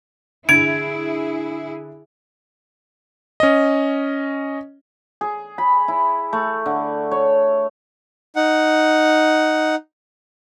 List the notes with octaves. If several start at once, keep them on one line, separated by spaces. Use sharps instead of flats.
D3 E4 G#4 G#6 D7 F7
C#4 D#5
G#4
B5
E4
A3
D3
C#5
D#4 F#5